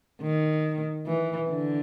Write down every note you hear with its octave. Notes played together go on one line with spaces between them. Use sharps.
D#3
E3
D3